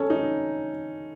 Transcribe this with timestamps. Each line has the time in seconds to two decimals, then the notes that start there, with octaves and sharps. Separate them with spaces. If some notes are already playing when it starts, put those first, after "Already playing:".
Already playing: C#4 A4
0.10 D#4